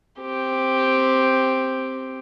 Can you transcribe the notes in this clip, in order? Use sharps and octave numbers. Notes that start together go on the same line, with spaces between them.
C4 G4